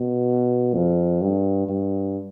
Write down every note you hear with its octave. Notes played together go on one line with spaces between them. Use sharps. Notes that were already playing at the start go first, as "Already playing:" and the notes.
Already playing: B2
F2
G2
G2